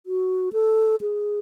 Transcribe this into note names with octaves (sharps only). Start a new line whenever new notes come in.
F#4
A4
G#4